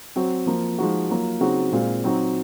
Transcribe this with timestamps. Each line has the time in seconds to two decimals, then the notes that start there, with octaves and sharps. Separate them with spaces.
0.16 F#3 C4 F#4
0.46 F3 A#3 F4
0.78 F3 G#3 D#4 F#4
1.10 F#3 A#3 F4
1.41 C#3 F#3 C4 D#4 F#4
1.72 A#2 G#3 C4 F4
2.04 F#3 C4 D#4 F#4